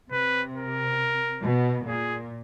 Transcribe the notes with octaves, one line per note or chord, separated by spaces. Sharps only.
C3 B4
A#4
B2
A#2 G#4